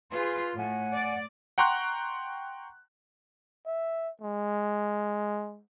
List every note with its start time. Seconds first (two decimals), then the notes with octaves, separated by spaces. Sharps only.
0.11 F4 G#4 B4 C6
0.56 A2 A3 F#5 G#5
0.93 D5
1.58 F#5 G5 A#5 C6 C#6 F#6
3.66 E5
4.22 G#3